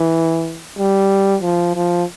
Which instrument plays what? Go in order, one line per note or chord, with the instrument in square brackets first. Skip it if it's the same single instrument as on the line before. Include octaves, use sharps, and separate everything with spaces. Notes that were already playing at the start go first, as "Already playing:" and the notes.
Already playing: [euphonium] E3
G3
F3
F3